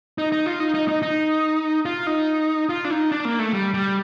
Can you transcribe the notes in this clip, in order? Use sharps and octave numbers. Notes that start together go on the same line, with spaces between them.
D#4
D#4
F4
D#4
D#4
D#4
D#4
F4
D#4
F4
D4
D#4
D4
A#3
A3
G3
G3